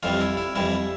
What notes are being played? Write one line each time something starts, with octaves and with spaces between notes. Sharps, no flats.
F2 E3 G3 F4
E4
E4
F2 E3 G3 E4